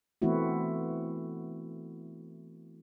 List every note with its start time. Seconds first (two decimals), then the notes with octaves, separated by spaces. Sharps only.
0.22 E3 A3 B3 C4 E4 F#4